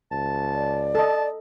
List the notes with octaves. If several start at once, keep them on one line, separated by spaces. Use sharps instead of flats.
C#2 A5
D5
A4 D#5 A5